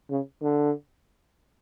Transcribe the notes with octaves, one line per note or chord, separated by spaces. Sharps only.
C#3
D3